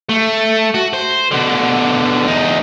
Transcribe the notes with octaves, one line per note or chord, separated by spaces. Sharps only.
A3
F#4
C5
B2 D3
E2 D#4